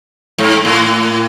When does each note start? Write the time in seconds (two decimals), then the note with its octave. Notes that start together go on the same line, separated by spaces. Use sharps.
0.38 G#2
0.65 A2